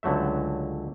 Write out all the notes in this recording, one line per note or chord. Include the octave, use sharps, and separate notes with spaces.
C#2 D3 F#3 A3 E5